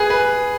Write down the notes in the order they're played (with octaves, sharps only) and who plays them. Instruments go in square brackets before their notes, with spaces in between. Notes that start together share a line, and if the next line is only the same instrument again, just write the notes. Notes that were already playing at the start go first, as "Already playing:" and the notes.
Already playing: [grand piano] G#4 B4
B4